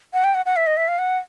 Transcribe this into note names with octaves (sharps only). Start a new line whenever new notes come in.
F#5
G5
F#5
F#5
E5
D#5
E5
F5
F#5